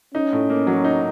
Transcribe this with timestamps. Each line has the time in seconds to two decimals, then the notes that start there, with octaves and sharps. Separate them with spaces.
0.14 C#4 D#4
0.33 A2
0.50 A#3
0.67 F#3
0.84 D#4